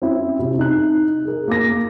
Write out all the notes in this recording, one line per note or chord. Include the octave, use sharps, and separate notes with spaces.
C4 C#4 E4
C3
D#4 F#6
G#4 A#4
A#3 D6 A#6